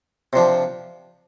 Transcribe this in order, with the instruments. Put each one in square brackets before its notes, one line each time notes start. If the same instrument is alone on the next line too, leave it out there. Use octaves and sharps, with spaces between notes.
[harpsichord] C3 F3 D4